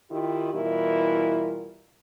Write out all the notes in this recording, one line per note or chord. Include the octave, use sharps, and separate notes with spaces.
D#3 E4 F4 G4
B2 E3 G3 E4 F4 A#4